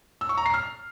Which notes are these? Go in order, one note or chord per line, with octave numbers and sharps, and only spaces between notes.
E6
C#6
A#5
C7
F6